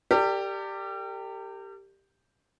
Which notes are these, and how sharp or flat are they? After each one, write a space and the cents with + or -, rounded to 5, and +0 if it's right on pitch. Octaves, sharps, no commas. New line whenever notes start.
G4 +0 A#4 -45 D5 +5